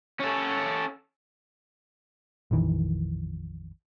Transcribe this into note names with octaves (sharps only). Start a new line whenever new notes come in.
C#4 A4
A#1 F2 D#3 E3